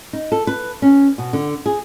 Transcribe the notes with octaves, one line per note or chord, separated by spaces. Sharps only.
D#4
A4
B4
C#4
B2
D3
G#4